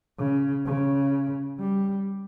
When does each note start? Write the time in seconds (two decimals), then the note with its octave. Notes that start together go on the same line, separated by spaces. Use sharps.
0.18 C#3
0.66 C#3
1.60 G3